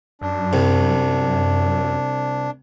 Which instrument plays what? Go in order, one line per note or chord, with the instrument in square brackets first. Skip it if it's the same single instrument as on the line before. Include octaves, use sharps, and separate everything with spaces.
[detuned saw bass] F#2 [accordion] D4
[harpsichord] C2 C3